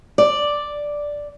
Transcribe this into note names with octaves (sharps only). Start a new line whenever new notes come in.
D5